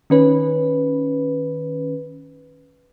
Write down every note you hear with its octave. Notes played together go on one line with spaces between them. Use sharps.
D#3 C#4 B4